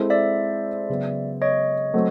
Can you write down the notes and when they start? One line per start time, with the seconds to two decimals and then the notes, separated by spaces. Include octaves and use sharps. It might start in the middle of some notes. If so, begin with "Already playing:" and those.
Already playing: G#3 C4 E4 A4 C5
0.10 D5 E5
0.89 C#3 F#3 B3
1.42 C#5 D#5
1.94 F#3 A3 C4